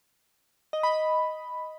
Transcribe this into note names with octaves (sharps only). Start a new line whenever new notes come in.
D#5
B5
B5